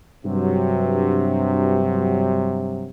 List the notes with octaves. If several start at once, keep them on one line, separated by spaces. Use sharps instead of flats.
G2 C3 F#3